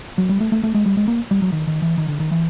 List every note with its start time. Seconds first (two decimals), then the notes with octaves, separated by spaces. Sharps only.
0.18 F#3
0.29 G3
0.40 A3
0.52 A3
0.63 A3
0.74 G#3
0.86 G3
0.97 G#3
1.08 A#3
1.31 G3
1.42 F#3
1.52 D#3
1.67 D#3
1.82 E3
1.98 D#3
2.08 D3
2.20 D#3
2.31 E3